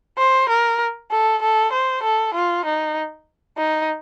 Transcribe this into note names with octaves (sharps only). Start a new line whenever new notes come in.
C5
A#4
A4
A4
C5
A4
F4
D#4
D#4